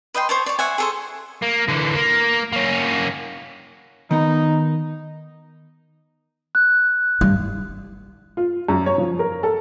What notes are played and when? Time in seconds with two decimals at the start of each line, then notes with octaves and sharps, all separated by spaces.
0.14 B4 D#5 G5 C6
0.29 C5 C#5 A5
0.46 C#5 D5
0.59 C#5 E5 F#5 G#5
0.78 G#4 A4 C5
1.42 A#3
1.68 D3 E3
1.94 A#3
2.53 A#3 C#4
4.11 D#3 B3 D#4 A#5
6.55 F#6
7.21 G2
8.37 F4
8.69 F#2
8.86 C#5
8.98 F3
9.19 A#4
9.43 A4